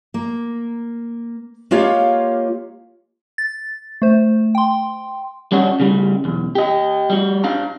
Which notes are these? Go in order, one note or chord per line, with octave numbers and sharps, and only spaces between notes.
A#3
G#3 A#3 F4 G4 C#5 F5
A6
A3 C5
G5 C6
G3 C#4 D4 F#4
C#3 G3
B1 E2
G4 D#5
G3 F#4
D4 F5 A#5